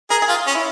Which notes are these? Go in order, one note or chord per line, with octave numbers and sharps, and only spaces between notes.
G#4 A#4
G#4
F4 G4
C#4
E4